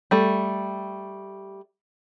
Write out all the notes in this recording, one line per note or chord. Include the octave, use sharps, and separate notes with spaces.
G3 A3